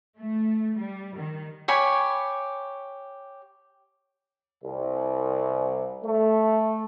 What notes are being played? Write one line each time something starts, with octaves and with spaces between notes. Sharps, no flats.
A3
G3
D#3
G4 C#5 G#5 B5
C2
A3